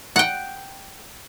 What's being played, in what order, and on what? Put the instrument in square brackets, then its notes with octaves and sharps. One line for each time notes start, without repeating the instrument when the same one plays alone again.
[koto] F#5 G5